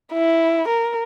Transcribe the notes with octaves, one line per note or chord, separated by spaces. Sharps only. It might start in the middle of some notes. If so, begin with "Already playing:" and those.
E4
A#4